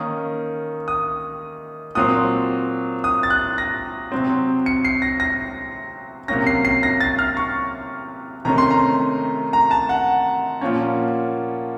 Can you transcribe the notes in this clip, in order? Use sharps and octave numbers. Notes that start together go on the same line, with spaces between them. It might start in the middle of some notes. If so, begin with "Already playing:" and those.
Already playing: D#3 A#3 C#4 D#6
D#6
A#2 F#3 C4 D#6
D#6
A6
F#6
A#6
C3 F#3 C4
C#7
C7
A#6
A#6
C3 F#3 A#3 C#4 A#6
C7
C7
A#6
A6
F6
C#6
C3 D#3 A3 C#4 A#5
C6
A#5
A#5
A5
F#5
A#2 F3 A#3 C#4